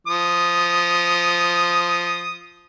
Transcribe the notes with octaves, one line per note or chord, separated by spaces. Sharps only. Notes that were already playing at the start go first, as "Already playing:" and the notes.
F3 D#6